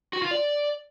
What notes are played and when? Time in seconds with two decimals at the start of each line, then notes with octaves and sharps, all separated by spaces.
0.13 F#4
0.22 F4
0.31 D5